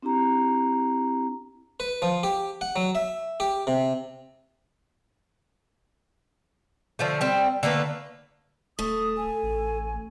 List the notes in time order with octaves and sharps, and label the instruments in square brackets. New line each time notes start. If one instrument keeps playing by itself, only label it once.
[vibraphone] C4 D4 E4 G4 A#5
[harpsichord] B4
F3
G4
F#5
F#3
E5
G4
C3
[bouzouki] D3 F3 A3
G3 C4
D3 A3 A#3 B4
[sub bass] D#1 [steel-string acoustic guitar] A3 [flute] D#6
[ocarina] A4 [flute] G#5
[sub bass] A1